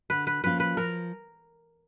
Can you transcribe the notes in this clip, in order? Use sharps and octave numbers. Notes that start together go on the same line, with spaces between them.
D3 B4
B4
F3 A#3 C#4 F4 B4
B4
F3 A#4